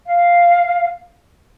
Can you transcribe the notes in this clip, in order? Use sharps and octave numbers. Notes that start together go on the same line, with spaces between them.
F5